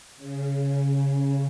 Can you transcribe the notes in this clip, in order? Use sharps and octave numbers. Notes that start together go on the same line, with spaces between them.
C#3